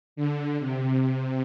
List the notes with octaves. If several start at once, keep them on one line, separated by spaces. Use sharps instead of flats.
D3
C3